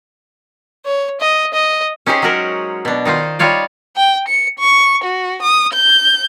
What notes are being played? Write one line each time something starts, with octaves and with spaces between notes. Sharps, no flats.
C#5
D#5
D#5
C#4 D#4 G4 G#4 C5
F#3 G#3 F#4 A#4
B2 D4
D#3 D#4 F4 C5
G3 D#4 F4 C#5 D5
G5
C#7
C#6
F#4
D#6
G6